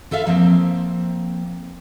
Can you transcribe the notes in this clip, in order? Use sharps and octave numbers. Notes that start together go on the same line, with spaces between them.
F4 A4 B4 E5 F5
F3 A#3 C4